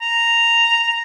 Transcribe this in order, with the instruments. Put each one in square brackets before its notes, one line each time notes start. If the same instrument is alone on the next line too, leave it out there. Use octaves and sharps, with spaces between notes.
[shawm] A#5